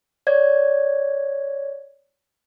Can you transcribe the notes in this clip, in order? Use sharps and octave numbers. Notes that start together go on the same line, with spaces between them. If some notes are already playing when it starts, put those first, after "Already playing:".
C#5 D5 G#6